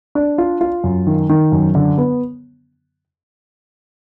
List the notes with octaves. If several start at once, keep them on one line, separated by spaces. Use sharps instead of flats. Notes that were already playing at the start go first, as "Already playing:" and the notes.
D4
F4
F4
F#2
D#3
D#3
F#2
D3
B3